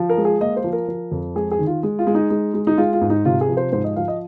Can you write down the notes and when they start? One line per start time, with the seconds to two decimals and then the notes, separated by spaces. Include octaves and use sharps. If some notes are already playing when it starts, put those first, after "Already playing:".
Already playing: F3
0.09 A#4
0.17 G#3
0.25 G#4
0.41 A#3 D#5
0.56 C5
0.64 F3
0.73 A#4
0.88 F3
1.11 F2
1.35 G#3 G#4
1.51 G#4
1.59 D#3
1.67 F4
1.83 G#3
1.99 F4
2.07 G#3
2.15 D#4
2.30 G#3
2.54 G#3
2.67 D#4
2.78 G#3 F4
2.93 F4
3.01 G#2
3.10 D#4
3.25 C3 F4
3.41 G#4
3.49 F3
3.57 C5
3.72 G#2 C5
3.84 D#5
3.96 F3 F5
4.08 D#5